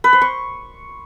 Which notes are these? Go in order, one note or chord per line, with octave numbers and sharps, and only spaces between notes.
B4
C5
C#6